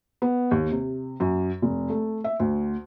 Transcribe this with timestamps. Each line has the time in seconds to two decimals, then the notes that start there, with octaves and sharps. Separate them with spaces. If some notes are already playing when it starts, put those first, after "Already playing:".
0.22 B3
0.51 D#2
0.72 C3
1.20 F#2
1.62 F1
1.89 A3
2.24 E5
2.40 D2